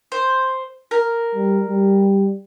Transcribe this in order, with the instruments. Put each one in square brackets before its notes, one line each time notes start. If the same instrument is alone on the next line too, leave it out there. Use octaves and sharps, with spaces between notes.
[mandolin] C5
A#4
[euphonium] G3
G3